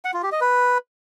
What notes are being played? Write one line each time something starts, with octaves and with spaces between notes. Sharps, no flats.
F#5
F4
G4
D#5
B4